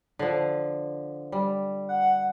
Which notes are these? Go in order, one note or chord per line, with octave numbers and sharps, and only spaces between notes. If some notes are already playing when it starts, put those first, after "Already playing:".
D3 F3
G3
F#5